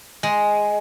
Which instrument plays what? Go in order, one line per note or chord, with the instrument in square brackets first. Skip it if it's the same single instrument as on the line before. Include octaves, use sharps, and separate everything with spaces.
[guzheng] G#3